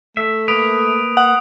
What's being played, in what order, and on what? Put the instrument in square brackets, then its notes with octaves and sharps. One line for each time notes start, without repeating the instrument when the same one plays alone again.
[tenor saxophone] A3 [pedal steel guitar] E5
[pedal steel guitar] A#3 B4 [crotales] D#6 D7 F7
[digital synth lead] F#5 [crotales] D#6